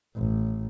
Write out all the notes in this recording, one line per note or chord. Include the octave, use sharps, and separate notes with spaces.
A1